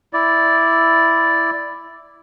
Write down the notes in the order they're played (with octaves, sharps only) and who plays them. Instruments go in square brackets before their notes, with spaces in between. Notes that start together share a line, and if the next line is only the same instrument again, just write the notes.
[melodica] E4 D5